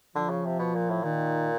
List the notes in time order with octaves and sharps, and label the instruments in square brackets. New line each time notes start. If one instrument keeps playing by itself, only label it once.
[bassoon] D3 [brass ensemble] F3
[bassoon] C#3
C3
B2
A#2
A2
[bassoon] A#2 [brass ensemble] D#3